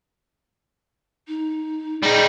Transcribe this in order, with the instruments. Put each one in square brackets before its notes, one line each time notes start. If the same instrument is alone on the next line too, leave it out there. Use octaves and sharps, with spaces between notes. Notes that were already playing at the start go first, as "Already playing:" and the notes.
[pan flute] D#4
[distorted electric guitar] G3 D#4 [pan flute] G#4